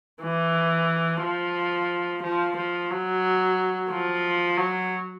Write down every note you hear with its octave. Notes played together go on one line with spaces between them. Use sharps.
E3
F3
F3
F3
F#3
F3
F#3